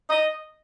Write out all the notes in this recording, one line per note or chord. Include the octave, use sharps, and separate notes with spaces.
D#5